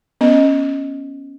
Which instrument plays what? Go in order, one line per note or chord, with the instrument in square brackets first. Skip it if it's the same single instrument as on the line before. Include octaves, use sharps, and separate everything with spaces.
[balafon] B3 C#4 D#5